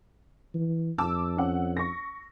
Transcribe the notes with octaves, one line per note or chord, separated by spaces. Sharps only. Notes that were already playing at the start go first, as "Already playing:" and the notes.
E3
F2 A5 D6 E6
C#4 F#5
C#6 A#6